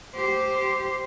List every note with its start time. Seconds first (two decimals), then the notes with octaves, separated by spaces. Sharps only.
0.15 G4 C5